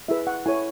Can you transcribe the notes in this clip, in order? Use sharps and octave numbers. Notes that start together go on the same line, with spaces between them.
E4 G#4 B4 E5
F#5
E4 A4 C#5 G#5